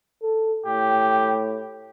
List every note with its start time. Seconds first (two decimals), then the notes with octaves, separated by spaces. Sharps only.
0.22 A4
0.66 A2 G4